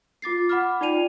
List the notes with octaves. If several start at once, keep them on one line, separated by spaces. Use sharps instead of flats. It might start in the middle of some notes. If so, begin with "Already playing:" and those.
F4 D6 A6 C7
F#5 B5 D6 F6
D#4 F4 D5 G5 D#7 F7